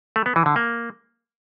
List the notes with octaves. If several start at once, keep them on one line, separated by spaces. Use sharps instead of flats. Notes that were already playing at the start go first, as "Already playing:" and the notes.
A3
B3
E3
D3
A#3